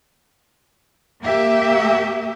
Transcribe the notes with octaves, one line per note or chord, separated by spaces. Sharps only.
A#3 G4 E5